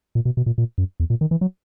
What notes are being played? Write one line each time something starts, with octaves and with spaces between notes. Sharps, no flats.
A#2
B2
B2
A#2
A#2
F#2
E2
A#2
D#3
E3
F#3